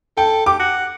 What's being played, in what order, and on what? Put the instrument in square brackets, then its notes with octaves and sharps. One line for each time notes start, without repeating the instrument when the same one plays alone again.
[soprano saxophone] A4 [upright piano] G5
[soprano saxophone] G4 [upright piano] D6
[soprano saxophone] F#5